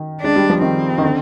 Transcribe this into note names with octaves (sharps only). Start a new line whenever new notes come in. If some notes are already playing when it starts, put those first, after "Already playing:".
Already playing: D#3
G#3 D4
G3
F3
D#3 C4
D#3
D3